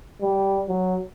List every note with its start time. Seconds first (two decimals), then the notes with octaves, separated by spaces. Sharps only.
0.21 G3
0.68 F#3